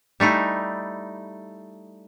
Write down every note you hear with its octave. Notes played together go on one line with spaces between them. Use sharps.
G3 A3 D#4 E4